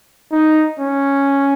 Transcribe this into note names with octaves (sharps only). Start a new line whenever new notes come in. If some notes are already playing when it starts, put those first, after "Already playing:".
D#4
C#4